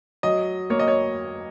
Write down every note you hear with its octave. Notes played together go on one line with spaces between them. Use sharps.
F#3 D#5
A#3 C#5
D#5
C#5